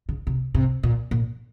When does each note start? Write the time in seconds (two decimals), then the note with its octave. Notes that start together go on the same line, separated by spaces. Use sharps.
0.09 C#3
0.27 C3
0.55 C3
0.83 A#2
1.11 A#2